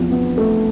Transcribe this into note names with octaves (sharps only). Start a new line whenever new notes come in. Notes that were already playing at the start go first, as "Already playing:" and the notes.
Already playing: E2 C3 F3
B3
A3